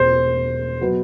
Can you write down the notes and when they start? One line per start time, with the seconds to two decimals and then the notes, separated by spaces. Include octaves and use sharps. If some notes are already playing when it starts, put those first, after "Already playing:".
Already playing: E1 C5
0.81 B2 F#3 B3